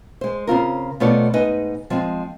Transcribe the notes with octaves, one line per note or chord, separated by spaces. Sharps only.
G#3 C5
C#3 C4 F4 A#4
B2 A3 B3 F4 C#5 D5
G#2 D#4 B4 D#5 G#5
F3 G#3 C4